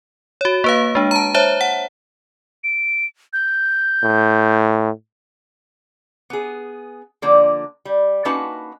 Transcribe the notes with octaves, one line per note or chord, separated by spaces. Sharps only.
F#4 C#5
A#3 B4 F5
G#3 D4
A5 A#5
C5 C#5 E5 A5
F#5
D7
G6
A2
B3 G#4
D3 F3 A#3 D5
G3
A#3 C#4 D#4 F#4 B4 A5